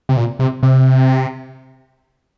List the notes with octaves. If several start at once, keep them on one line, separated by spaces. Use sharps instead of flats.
C3
A#2
C3
C3